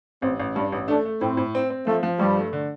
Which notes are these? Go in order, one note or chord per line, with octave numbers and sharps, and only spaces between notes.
A1 C4
A1
G2 D4
A1
A3 D4
A3
A2 C4
A2
C4
C4
F3 A3
F3
G2 G3
A3
D3